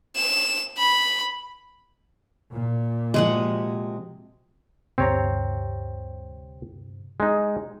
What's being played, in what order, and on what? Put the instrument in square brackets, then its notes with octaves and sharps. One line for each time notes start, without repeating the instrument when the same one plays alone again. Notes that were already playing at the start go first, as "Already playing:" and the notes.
[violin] E7
B5
[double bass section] A#2
[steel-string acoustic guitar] C3 F3 F#4 [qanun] G#3 G#4 F#5
[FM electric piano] D2 G2 C3 [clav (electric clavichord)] C4 C#5 A#5
[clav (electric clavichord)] G#3 D#4